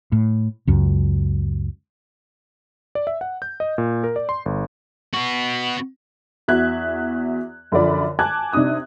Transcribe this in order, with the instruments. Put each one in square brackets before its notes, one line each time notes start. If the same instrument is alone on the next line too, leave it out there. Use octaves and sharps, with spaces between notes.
[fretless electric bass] A2
C#2 F#2
[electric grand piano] D5
E5
F#5
G6
D#5
A#2
A#4
D5
C6
G1
[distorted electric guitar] B3 F#4
[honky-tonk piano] E2 F#4 E5 F#6 G#6
F#2 D3 F3 D5 B5
G#5 A5 D6 F#6 G#6
C3 D4 D#4 D#6 F#6